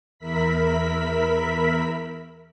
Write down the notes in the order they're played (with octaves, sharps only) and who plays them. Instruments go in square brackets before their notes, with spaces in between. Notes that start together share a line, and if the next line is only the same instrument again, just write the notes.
[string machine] E2 A#4 E5 B5 B6